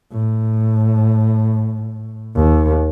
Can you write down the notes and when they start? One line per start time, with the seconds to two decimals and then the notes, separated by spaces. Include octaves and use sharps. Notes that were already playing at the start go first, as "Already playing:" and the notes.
0.12 A2
2.35 D#2